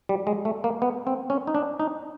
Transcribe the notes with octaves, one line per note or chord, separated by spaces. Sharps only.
G3
G#3
A3
A#3
B3
C4
C#4
D#4
D4
D#4